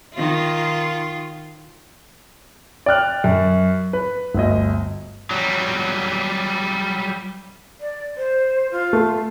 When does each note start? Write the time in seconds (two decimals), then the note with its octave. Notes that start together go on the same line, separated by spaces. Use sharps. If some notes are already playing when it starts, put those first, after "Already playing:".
0.14 D#3 F4
2.86 D5 G5 F6 F#6
3.24 F#2
3.93 B4
4.34 G1 D2 D#5
5.31 F#3 G3
7.80 D5
8.17 C5
8.72 F4
8.93 A3